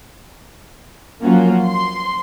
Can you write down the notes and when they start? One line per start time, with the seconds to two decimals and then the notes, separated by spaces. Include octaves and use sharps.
1.23 F3 F#3 A#3 C#4 F4 F#4
1.65 C6